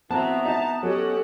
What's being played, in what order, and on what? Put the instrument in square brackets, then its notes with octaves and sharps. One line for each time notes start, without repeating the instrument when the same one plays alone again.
[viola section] E3 C4 F#4 [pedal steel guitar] B3 [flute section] E5 A#5 [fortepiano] A5
[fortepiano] D#4 [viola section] A5
[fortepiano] F#3 [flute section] C#4 D#5 G#5 [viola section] G4 A4 F#5